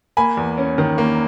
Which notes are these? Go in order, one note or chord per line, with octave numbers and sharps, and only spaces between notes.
A#3 G#5 B5
E2
C#4
D#3
A#3